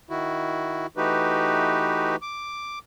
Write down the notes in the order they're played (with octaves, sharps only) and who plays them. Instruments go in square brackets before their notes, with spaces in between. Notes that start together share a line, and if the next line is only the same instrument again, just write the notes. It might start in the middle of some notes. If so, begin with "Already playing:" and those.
[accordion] D#3 E4 F#4
E3 A3 D#4 F#4 G4 B4
D6